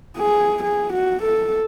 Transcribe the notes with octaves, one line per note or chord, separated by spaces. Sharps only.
G#4
G#4
F#4
A4